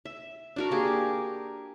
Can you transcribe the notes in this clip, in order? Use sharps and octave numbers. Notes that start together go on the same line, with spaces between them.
E5
D4 F#4 A#4
A#3 G4 G#4